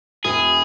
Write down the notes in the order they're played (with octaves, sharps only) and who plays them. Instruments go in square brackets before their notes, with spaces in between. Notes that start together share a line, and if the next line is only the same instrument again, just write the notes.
[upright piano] E1 [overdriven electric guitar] G#4